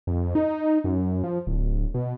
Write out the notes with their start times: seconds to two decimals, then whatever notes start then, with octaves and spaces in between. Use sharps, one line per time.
0.07 F2
0.35 D#4
0.84 F#2
1.24 F3
1.47 D1
1.94 B2